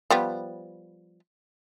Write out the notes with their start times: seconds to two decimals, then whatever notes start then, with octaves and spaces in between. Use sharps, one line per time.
0.10 F3 G3 B3